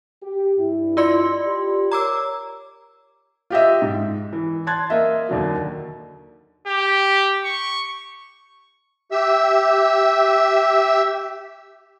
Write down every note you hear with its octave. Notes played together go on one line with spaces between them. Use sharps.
G4
G2 E4
F4 D5 C6
G4
A#4 C#5 A#5 D6 E6
F4 G4 D#5 E5
G#2
E3
A5 C6 F#6 G#6 A6
A#3 D#5 E5
D#2 D3 F#3
G4
C#6
G4 E5 E6